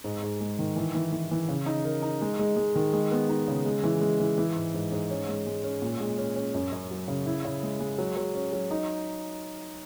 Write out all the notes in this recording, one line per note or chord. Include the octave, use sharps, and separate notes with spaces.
G#2
G#2
G#3
D#3
E3
E3
E3
E3
C#3
D#4
A#4
D#4
G#3
G#3
G#3
D#3
G#3
B3
D#4
C#3
G#3
E3
G#3
E3
E3
G#2
G#2
G#2
C#4
G#3
G#3
C#4
A#2
G#3
C#4
C#4
F#2
F#2
F#3
C#3
E4
C#3
G#3
G#3
F#3
F#3
C#4
F#3
D#4